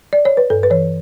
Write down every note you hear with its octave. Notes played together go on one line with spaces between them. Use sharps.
D5
C#5
B4
G2 A4
B4
E3 C#5